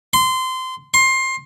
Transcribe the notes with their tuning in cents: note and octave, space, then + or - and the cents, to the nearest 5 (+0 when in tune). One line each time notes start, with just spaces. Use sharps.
C6 -20
C6 +20